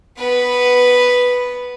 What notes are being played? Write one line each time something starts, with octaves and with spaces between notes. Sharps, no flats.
B3 B4